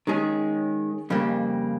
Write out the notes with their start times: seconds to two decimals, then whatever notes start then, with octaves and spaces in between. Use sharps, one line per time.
0.07 D#3 G#3 C#4 G#4
1.10 F2 C#3 G3 A#3